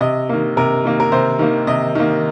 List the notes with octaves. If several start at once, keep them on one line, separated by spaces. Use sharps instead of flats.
C3 D#5
D#3 A#3
C3 A#4
D#3 A#3
A#4
C3 C5
D#3 A#3
C3 D#5
D#3 A#3